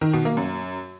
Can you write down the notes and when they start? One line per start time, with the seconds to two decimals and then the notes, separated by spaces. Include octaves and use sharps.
0.01 D#3
0.13 B2
0.25 A#3
0.37 F#2